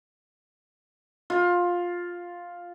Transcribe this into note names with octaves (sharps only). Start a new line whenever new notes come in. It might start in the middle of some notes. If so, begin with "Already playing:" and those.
F4